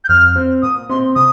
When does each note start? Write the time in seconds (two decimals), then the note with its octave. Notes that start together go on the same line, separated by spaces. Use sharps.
0.05 G6
0.09 F2 F6
0.36 C4
0.62 A#2 D#6
0.89 C4 C6
1.16 C3 D#6